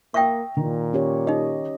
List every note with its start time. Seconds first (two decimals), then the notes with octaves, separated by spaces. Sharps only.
0.14 A#3 E5 G5 C#6 D#6 A#6
0.57 A#2 D#3
0.93 C#4 G4 C#5
1.27 D#4 G4 D#5